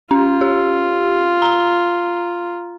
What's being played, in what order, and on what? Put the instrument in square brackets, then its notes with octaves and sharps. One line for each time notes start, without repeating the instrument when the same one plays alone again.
[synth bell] C#4 [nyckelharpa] F4
[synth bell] G4
A#5